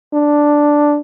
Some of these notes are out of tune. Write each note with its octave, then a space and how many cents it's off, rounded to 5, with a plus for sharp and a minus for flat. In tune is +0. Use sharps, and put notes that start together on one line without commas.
D4 +0